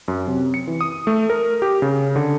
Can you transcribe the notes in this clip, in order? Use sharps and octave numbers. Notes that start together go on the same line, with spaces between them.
F#2
C3
C#7
E3
D#6
A3
A#4
G4
C#3
D3